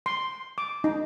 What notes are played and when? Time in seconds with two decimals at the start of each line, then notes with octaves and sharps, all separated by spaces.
0.06 C6
0.58 D6
0.84 D#4